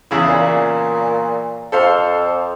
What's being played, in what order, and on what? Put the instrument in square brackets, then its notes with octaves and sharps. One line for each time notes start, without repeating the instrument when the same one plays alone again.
[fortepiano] E2 C#3 E4
[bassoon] A#2
[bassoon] F2 [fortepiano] A4 C5 F5